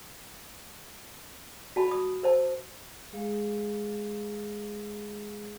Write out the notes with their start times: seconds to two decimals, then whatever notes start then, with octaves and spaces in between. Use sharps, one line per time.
1.76 F#4 A5 B5
1.88 B5 D#6
2.23 A#4 C5 A5
3.12 G#3 G#4 F5